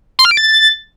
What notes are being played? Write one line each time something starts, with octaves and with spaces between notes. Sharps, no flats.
C6
F6
D7
A6